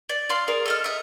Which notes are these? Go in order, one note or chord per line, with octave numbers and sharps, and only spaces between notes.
D5
D5 F5 C6
G#4 A#4 D5
A4 D#5 F6
D#5 E5